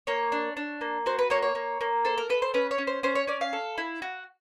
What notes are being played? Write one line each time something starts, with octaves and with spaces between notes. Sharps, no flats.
A#3 C#5
D4
D4
A#3
F#4 C5
B4
A#3 C#5
C#5
A#3
A#3
A4 C5
A#4
A4 B4
C5
C#4 B4
C#5
C#4
C5
C#4 C5
C#5
C#4 D5
F5
A4
E4
F#4